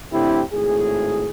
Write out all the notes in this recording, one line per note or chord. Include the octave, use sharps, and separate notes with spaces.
A2 D3 C4 E4 G4
G#1 A2 G#4